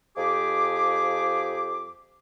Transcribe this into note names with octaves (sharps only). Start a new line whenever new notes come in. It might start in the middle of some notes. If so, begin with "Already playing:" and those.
F2 F3 G4 G#4 D6